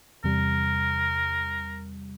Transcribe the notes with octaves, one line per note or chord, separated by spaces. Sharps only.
E2 C3 G3 A#4